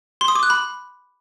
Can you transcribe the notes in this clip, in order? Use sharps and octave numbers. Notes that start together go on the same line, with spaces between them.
C6
D#6
D6
F#6
B5